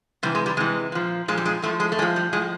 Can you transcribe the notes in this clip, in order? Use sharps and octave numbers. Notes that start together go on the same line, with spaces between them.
C3 E3 G3
G#3
G3
C3 E3 G#3
A#2 F3
A#2 F3 G#3
G3
G#3
A2 F3 A3
G#3
A3
A2 F3 G#3
G3
A2 F3 G#3